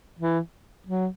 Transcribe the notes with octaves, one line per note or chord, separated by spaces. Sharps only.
E3
F#3